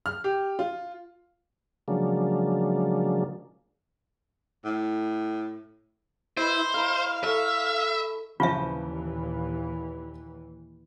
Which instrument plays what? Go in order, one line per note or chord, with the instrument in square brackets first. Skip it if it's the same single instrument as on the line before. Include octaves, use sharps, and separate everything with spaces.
[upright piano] F6
G4
F4
[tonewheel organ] C#3 F3 F#3 G#3 A#3 D4
[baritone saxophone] A2
[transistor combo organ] E4 [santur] B4 D#5 [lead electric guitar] C5
[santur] E4 A#4 [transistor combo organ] F5
[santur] A4 C#6 [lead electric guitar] E5
[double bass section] D#2 A#2 E3 [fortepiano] C#3 F3 [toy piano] F4 E5